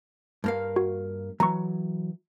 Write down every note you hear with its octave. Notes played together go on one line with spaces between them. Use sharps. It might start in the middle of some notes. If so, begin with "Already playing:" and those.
G2 A#3 F5
F#4
E3 F#3 A#5 C#6